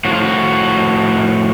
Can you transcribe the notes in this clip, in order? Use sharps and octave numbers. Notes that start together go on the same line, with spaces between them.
A2 F3 F#4
F4
F#4